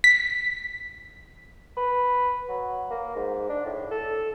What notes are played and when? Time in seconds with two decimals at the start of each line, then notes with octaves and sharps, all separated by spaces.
0.04 B6
1.77 B4
2.49 F#3
2.90 A#3
3.16 G#2
3.49 D4
3.66 A2
3.91 A4